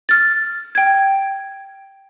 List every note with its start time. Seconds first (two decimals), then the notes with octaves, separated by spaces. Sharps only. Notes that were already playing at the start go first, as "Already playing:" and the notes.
0.09 F6 A6
0.75 G5 G#6